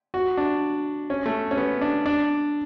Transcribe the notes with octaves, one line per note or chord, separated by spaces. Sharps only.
F#4
D4
C#4
A3
C#4
B3
D4
D4